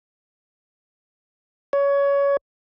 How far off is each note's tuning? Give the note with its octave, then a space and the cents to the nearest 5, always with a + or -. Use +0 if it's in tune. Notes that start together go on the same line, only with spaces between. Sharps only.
C#5 +20